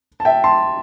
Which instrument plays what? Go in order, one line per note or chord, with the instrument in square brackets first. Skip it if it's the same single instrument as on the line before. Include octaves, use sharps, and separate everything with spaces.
[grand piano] A5
E5 G5
A5 C6